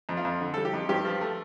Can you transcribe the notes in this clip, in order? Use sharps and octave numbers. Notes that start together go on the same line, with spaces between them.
F2
F4
F2
D3
G3 A4
G4
F2
G2 G4
F3
A3